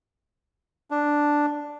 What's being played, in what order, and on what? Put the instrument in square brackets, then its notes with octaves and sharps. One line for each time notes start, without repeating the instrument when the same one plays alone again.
[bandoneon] D4